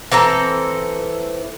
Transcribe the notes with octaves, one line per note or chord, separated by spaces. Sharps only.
E3 C4 A4 A#5